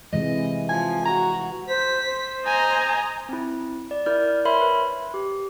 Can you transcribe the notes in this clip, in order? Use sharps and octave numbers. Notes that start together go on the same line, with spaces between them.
C3 E3 G#3 D#5
F3 G#5
F#4 A#5
C5 B6
C5
D#5 G#5 A#5
C4 E4
D5
E4 A#4 D5 F6 G6
A#4 C#5 E5 B5 C6
B4
G4